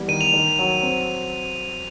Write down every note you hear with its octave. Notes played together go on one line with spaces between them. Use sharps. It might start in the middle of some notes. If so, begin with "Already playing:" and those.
Already playing: E3 G3 B3
D#3 D#7
F7
D#3
F#3
C4